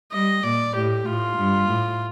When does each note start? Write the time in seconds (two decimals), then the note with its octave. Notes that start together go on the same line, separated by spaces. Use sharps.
0.12 G3 D#5
0.43 A#2 D5
0.75 A2 G4
1.06 A2 F4
1.37 G2
1.68 A2